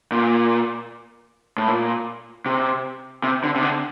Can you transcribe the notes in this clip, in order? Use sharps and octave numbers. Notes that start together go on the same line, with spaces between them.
A#2
A2
A#2
C3
C3
D3
C3
D3